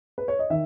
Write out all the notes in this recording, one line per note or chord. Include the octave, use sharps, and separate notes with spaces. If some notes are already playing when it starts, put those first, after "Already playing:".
B4
C#5
D#5
D#3 E5